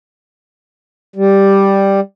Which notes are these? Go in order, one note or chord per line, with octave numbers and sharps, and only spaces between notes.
G3